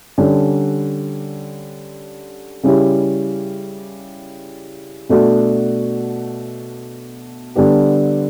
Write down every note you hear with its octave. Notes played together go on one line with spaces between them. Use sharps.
D3 G3 C#4
C#3 G3 C#4 E4 G4
B2 A3 D4 F#4
D3 G3 B3 D4 G4